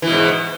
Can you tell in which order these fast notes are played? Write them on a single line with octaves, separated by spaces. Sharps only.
E3 B2 G#2